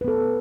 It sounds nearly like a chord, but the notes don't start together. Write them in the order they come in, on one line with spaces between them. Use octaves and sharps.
B4 B3 A4